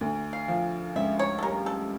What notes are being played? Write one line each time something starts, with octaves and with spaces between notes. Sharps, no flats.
D2
F5
F3
C#2 E5
C#5
A4
G3 A#4
A4